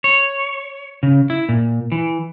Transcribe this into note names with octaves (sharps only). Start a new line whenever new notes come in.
C#5
C#3
E4
A#2
E3